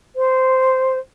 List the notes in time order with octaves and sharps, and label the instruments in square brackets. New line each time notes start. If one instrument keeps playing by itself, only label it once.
[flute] C5